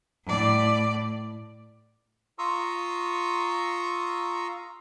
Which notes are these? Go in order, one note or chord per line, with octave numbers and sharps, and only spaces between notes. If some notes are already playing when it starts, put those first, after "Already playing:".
A2 D5
F4 A#5 C6 C#6 D#6 E6